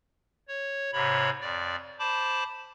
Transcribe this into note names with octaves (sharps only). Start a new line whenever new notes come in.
C#5
G#2 C3 C#5 B5
F2 D5
C5 A5 B5 D6